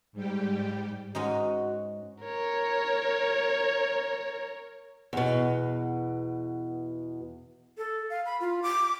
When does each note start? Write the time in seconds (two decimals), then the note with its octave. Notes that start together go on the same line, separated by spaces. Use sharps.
0.13 G#2 G3 G4
1.15 G#2 C#4 D#4 F#4
2.23 A#4 C#5
5.13 E2 B2
7.78 A4
8.10 F5
8.26 B5
8.40 F4
8.63 D6